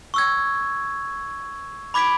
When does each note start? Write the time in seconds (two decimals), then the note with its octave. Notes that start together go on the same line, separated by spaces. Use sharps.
0.14 C#6 E6 G#6
1.94 B5 D6 G#6 B6 D7